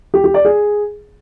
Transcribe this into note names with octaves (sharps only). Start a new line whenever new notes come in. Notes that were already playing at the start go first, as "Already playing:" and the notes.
G4
G4
D5
G#4